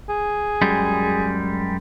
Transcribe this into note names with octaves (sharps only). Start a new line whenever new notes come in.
G#4
F#2 G3 G#3